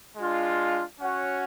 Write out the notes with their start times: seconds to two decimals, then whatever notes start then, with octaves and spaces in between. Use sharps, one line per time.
0.17 G#3 D4 F4
1.01 C#4 F#4 C#5 F#5